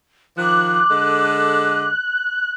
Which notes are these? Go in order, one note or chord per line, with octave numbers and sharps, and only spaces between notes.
D#3 F3 D6 F#6
D3 G#3 A4